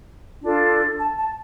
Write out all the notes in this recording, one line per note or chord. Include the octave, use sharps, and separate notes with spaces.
D4 F4 A4
A5
A5